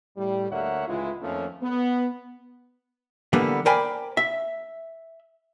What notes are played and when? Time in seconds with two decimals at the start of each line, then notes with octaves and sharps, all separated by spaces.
0.17 A2 G3
0.50 D2 D3 A#3 C#5 E5 F#5
0.87 C#2 A2 E3 G#3 E4 F4
1.22 F2 D#3 F3 A3 A#3 C#4
1.62 B3
3.33 D3 E3 G3 A#3 B3
3.66 A#4 C5 D5 G5 G#5 B5
4.17 E5